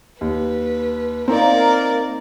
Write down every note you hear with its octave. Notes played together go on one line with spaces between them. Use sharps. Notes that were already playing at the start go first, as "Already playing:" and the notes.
D#2 B4
A#3 C4 D#4 A#4 D5